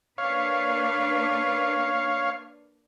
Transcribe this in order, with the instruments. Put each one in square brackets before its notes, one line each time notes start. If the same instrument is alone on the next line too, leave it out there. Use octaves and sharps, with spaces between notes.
[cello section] A#3 D4 B4 [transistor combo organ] C#5 F5